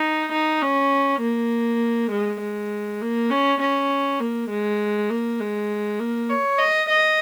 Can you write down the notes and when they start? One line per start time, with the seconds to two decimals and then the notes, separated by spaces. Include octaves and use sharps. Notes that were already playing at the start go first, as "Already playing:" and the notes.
Already playing: D#4
0.33 D#4
0.62 C#4
1.21 A#3
2.12 G#3
2.41 G#3
3.01 A#3
3.30 C#4
3.61 C#4
4.20 A#3
4.50 G#3
5.10 A#3
5.40 G#3
5.99 A#3
6.30 C#5
6.59 D#5
6.90 D#5